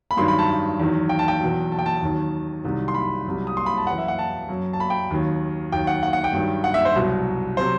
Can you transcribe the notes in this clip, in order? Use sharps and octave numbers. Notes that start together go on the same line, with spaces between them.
B5
G2 D#3 F#3 C6
B5
A5
E2 D#3 F#3
G5
A5
G5
E2 B2 F#3
A5
G5
A5
D#2 D#3 F#3
C2 C3 D#3 F#3
C6
B5
C2 C3 F#3
D#6
C6
B5
A5
F#2 E3 F#5
E5
F#5
A5
F#2 F#3
A5
B5
G5
D#2 D#3 F#3
D#2 D#3 F#3 G5
F#5
F#5
F#5
G5
G2 D#3 F#3
F#5
E5
C5
C2 B2 F#3
C3 F#3 C5